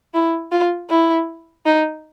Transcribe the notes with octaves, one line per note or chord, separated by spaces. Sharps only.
E4
F4
E4
D#4